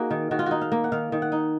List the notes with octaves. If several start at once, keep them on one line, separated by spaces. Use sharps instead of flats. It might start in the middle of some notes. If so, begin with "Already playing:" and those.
Already playing: A#3 D#4 F#4 G#4
D#3
D#3 F#4
F4
D#4 F#4
F5
A#3
F#5
D#3 F5
D#3
F#5
D#4